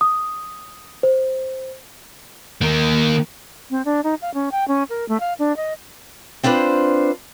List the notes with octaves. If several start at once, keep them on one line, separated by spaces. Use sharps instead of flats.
D#6
C5
D#3 A#3
C4
D4
D#4
F5
C#4
G5
C#4
A#4
A3
F5
D4
D#5
C4 D4 F4 B4 C5